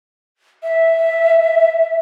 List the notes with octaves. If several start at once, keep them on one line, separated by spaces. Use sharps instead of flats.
E5